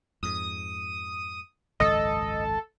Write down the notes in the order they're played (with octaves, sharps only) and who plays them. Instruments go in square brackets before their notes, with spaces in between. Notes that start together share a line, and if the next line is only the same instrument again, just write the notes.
[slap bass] F2 G#2 [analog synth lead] D#6
[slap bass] G#1 C#2 F#2 [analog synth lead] A4 [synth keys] D#5